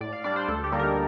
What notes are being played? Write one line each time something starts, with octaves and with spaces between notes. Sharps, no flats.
A2 D5
F5
G3 D4 D5
C5
D2 A4
G4
D3 G3 A#3 D#4
A#4